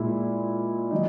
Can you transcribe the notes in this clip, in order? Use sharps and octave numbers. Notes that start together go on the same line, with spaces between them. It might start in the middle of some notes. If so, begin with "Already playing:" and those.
Already playing: A#2 G#3 E4
D#3 F#3 D#4